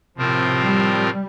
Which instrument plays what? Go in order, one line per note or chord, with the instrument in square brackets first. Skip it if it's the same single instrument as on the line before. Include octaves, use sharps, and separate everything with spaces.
[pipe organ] A2 F3 C4 F4 A#4 [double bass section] C3
[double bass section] G3